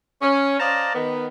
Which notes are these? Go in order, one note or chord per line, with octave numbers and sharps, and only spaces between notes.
C#4
C5 D5 D#5 F5 A5 A#5
D#3 B3